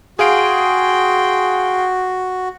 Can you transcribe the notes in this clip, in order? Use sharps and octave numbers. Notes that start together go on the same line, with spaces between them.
F#4 G#4 F5 G5 C6 D7